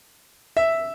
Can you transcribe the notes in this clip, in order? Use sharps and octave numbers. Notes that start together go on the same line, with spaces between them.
E5